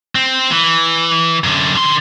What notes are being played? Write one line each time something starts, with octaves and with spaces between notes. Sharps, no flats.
C4
E3
F#2 D3
D3 C6